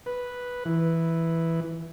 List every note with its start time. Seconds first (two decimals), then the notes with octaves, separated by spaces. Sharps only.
0.06 B4
0.65 E3